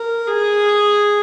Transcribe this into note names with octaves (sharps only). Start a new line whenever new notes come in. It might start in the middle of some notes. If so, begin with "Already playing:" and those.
Already playing: A#4
G#4